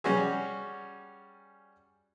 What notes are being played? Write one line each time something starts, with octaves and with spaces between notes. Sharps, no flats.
G3 C#4 F#4 G#4